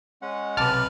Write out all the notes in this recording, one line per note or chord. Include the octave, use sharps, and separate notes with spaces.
G#3 C#4 F#5
B1 C3 B4 A5 D6 F6 A6